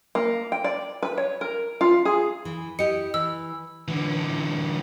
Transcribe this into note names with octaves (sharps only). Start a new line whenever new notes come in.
A#3
G5
D5
B4
C#5
A#4
F4
G#4
E3
E4 G4 D#5 C#7
E3 E6
D3 E3